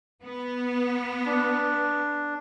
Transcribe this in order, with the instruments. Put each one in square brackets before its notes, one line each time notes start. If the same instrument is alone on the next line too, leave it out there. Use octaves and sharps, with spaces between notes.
[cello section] B3
[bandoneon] D4